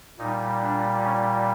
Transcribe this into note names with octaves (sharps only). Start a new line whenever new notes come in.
A#2 G3 D#4
D4
C#4